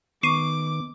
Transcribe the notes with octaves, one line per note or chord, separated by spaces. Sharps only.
D#3 B3 C#6 D6 C7 D#7